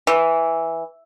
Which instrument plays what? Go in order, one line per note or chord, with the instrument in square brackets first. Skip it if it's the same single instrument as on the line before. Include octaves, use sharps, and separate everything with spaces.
[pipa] E3